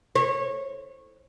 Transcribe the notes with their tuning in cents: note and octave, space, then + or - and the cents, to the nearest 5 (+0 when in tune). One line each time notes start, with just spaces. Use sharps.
C#5 -20